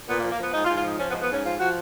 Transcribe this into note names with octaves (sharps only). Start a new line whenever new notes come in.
A#2 B3
A#3
F3
A#3
F3 B3
G#2 D#4
F4
G#2
F4
F3 D#4
F3 C#4
B3
G#2
B3
G#2 C#4
F3 F4
F3 F#4